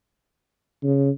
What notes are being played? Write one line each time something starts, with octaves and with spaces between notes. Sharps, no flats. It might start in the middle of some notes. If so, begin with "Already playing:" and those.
C#3